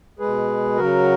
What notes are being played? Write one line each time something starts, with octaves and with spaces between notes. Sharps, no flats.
B2 G#3 G#4 B4
C#3 F#3 F#4 A#4